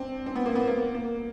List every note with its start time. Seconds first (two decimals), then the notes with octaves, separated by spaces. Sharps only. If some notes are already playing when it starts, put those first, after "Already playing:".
Already playing: C4 D4
0.26 C4
0.36 B3
0.46 A#3
0.55 B3
0.67 A#3
0.95 A#3